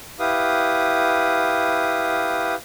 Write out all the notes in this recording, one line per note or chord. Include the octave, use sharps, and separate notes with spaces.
E4 G4 B4 F5 D#6